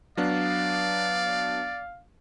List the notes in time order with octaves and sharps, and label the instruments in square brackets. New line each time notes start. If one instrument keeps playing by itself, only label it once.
[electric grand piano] F#3 B3 D4 [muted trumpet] D5 [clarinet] F5